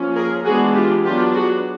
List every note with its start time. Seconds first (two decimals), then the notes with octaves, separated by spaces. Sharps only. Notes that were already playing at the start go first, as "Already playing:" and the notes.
Already playing: F3 A#3 C#4
0.15 G#4 A#4
0.44 E3 G#3 B3 D4 F#4 G#4
0.74 F4 G4
1.04 F#3 B3 D4 F4 G4
1.34 F#4 G#4